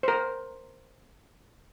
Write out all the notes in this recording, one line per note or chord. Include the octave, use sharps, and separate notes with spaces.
C5
A#4